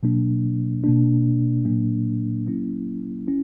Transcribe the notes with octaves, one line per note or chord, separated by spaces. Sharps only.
B2 F#3 A#3 D4
B2 A#3 D4
A#2 F#3 A#3 D4
F#3 A#3 C#4 E4
C#4 E4